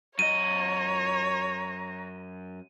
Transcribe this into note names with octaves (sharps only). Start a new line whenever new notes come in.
F#2 C#5 D#5 A#5 D#7